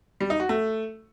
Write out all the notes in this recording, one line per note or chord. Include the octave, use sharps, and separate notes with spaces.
G3
D#4
F#4
A3